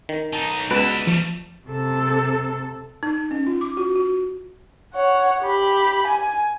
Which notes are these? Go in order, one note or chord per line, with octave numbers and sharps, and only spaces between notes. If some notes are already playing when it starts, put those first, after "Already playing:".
D#3
B1 D#4 G#5 A5
C#2 B2 B4 D5 E5
F3 G3 A3
C3 A4
D#4
C#4
F4
D6
F#4
F#4
C#5 F#5
G4 B5
G#5